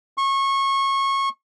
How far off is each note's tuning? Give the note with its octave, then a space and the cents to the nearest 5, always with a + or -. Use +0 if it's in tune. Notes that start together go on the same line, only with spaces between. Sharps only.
C#6 -25